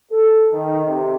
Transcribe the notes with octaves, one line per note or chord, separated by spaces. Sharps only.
A4
D#3
C3